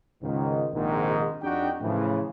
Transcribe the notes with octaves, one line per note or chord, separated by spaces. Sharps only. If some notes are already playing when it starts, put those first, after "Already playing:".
C#2 G#2 D#3
A#1 G#2 C3 D#3
F2 D4 D#4 F#4 G4 G5
A2 C#3 E3 F3